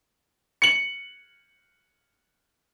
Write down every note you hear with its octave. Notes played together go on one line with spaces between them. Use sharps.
C#7 F#7